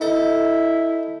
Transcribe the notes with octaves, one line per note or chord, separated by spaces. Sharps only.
D#4 E4 A4